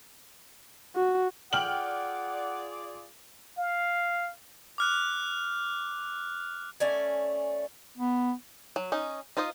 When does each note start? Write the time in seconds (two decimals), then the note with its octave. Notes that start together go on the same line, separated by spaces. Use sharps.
0.95 F#4
1.53 F4 G#4 D5 F#5 G5 F6 F#7
3.58 F5
4.78 D6 F6 F#6
6.80 A3 C#4 D5 G#5
7.97 B3
8.76 F#3
8.92 C#4 D#4
9.37 D#4 F4 C5 D#5